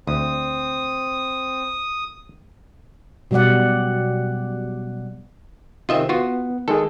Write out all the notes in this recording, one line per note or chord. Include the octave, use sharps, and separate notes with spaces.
D2 C4 D#6
B2 F#3 G3 D5 F#5
C3 D#3 C4 F4 D#5 E5
B3 F4 F#4
D#3 G#3 G#4 A4